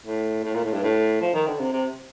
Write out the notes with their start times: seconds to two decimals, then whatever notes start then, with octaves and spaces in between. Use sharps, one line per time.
0.06 A2
0.45 A2
0.55 A#2
0.64 A2
0.73 G2
0.83 A2
1.21 F3
1.34 D#3
1.47 D3
1.60 C3
1.73 C3